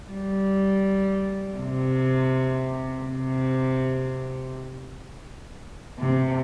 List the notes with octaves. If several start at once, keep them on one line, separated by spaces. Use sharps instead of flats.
G3
C3
C3
C3